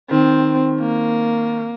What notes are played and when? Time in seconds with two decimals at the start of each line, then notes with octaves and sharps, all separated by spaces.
0.10 D#3 C4
0.80 A#3